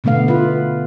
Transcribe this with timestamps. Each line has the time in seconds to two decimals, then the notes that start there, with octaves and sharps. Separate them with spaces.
0.04 B2 D3 A3 B3 F5
0.28 F4 B4